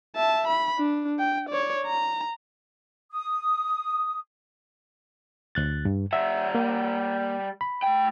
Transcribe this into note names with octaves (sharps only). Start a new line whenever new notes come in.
E5 A5
B5
D4
G5
C#5 D5
A#5
D#6
D2 F#6 A6
G2
G3 E5 F#5
A#3
B5
A3 G5